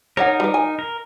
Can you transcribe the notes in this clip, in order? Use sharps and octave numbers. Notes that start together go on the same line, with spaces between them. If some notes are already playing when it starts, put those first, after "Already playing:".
D#4 A#4 C#5 D5 F#5
G3 B4
G#5
A#4